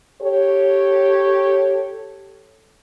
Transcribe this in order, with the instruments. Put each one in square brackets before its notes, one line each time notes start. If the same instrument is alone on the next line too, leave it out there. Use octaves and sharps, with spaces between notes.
[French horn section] G4 A4 C#5